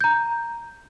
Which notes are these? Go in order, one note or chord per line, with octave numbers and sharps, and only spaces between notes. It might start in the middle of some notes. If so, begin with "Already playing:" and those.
A#5 G6